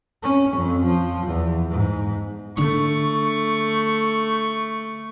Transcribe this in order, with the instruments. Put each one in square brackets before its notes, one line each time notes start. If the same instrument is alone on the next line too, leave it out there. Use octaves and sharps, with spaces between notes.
[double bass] C#4
F2
F3
E2
G#2
[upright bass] D3 D4 [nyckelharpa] A3 C#6